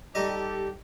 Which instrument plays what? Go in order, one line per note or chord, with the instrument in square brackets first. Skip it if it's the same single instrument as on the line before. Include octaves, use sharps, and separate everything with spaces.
[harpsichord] G3 D#4 D#5 [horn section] G4 A4